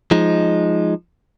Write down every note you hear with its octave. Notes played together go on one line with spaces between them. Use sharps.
F3 G#3 D#4